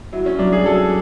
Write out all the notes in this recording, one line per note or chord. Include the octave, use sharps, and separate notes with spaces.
F#3 E4
C#4
F#3 D4
G#4
F#3 A4